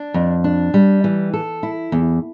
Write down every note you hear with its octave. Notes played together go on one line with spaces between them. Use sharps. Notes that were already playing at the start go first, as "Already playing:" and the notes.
Already playing: D4
F2
D4
G3
E3
A4
E4
E2